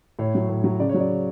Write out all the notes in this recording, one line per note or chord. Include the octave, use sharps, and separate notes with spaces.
A2 C#5
F#3
A2
F#3
C#3 D5
C#5
F#3
D5
C#3